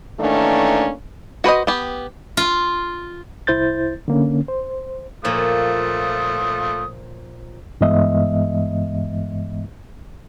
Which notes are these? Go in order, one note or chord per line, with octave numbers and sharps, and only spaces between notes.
D#3 E3 A3 A#3 C#4 D4
F#4 B4 C5 D#5
B3 G4
F4
C2 E4 C5 G6 A6
D3 A#3 C#4
C5
A#2 F3 A3 F4 C#5 D#6
G2 E3 G#3 B3 D#5 E5